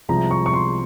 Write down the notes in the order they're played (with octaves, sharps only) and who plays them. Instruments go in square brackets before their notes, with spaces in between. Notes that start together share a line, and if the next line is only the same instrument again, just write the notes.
[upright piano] C2 C3 F3 G#3 A#5
C#6
C#6
C6